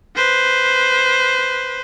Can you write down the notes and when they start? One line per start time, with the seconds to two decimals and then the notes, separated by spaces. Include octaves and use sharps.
0.16 B4 C5